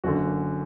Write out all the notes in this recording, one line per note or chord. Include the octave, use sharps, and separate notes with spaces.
F#1 F#2 D3 F#4